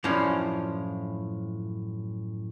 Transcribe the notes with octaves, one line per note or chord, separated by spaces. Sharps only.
F#2 A2 E3 F3 C#4 D4